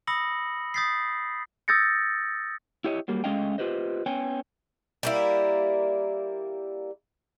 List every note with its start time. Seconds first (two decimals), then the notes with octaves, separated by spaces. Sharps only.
0.07 B5 D#6 E6 A#6 C#7 F#7
0.74 D#6 G6 A6 B6 C7
1.68 D#6 E6 G6 A6 A#6 C#7
2.84 E4 G4 C#5 D#5
3.08 F#3 G3 A#3
3.24 G#3 A3 C#4 D#5 F5 G5
3.58 F4 G4 B4 C5 D#5
4.06 B3 C#4 C#5 G5 G#5
5.03 G3 A#3 E4